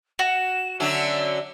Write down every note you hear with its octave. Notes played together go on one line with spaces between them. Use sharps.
F#4 E7
D3 F#3 C#4 E5